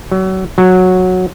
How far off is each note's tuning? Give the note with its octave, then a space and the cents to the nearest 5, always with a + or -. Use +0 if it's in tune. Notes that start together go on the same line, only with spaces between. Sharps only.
F#3 +30
F#3 -10